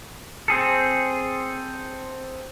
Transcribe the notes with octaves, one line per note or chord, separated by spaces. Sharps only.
C4 G#4 A4